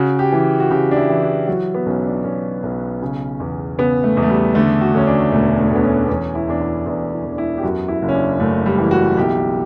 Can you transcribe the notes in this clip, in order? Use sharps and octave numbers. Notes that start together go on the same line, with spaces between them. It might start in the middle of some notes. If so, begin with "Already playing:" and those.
Already playing: C#3 F#4
G4
E3
F#4
C#3 G4
D4
E4
E3
G4
F#3 F#4
B3
B1 C#4
D4
B1 C#4
B1
C#3
E2
C#3 B3
A3
E2
A3
G3
D3 A3
F#4
D2 C#4
D4
E1 A3
A3
D2 B3
C#4
B3
E2 C#4
E4
E2 D4
E4
E2 D4
E4
E2
D4
E4
G4
F#2 F#4
E4
F#1
C#4
D4
F#1 A3
G3
E3
F#4
B1 G4